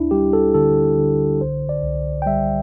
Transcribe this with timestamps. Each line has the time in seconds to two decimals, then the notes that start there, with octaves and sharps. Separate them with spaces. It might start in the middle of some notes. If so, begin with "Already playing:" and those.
Already playing: D2 D4 E4
0.11 G3 G4
0.33 A4
0.54 D3 A4
0.98 D3
1.41 C2 C5
1.69 D5
1.83 C2
2.22 G5
2.26 G3 E5